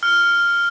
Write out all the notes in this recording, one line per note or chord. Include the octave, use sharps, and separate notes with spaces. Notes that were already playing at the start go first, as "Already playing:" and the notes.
F6